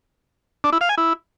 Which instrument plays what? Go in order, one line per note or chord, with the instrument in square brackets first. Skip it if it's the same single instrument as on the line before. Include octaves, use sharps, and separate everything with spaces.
[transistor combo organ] D4
E4
F5
G#5
E4